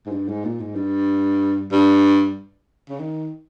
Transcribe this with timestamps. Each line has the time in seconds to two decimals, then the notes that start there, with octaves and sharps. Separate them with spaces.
0.06 G#2
0.12 G2
0.28 G#2
0.45 A#2
0.60 G#2
0.76 G2
1.72 G2
2.89 C#3
2.99 D#3